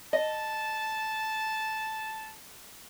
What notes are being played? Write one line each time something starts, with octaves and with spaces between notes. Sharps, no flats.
D#5 A5